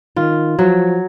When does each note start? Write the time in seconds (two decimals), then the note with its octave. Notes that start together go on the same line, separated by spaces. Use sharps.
0.16 D#3 F4
0.59 F3 F#3